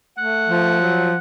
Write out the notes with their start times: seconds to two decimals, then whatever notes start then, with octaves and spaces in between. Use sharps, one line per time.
0.18 A3 F#5
0.49 F3
0.80 F#3